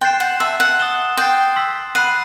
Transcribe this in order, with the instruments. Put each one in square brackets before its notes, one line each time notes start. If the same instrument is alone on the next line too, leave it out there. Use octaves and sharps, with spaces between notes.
[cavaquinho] G5 [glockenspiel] C6 F#6 A6 C7 E7
[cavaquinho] F#5
[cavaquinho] E5 [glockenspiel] A5 C6 E6
[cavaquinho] F#5
[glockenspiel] D#6 A6 E7 G7
[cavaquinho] G5 [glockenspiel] C6 D#6 F#6 A6 C7
[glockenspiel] C6 E6 B6
[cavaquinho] F#5 [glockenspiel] B5 F#6 C7 D#7